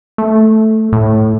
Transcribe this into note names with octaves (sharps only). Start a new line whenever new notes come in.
A3
A2